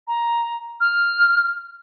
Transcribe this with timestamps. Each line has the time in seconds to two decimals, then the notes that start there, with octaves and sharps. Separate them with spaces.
0.08 A#5
0.80 F6